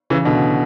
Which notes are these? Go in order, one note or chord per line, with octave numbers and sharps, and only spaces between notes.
C#3 E3
B2 D3